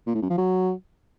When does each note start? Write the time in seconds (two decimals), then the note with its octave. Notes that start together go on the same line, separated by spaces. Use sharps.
0.07 A#2
0.14 A2
0.22 F#2
0.30 F3
0.38 F#3